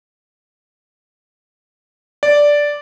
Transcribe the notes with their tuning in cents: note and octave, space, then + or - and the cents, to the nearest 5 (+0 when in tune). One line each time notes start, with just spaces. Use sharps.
D5 -5